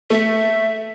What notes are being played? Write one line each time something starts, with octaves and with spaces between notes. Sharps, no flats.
A3 E5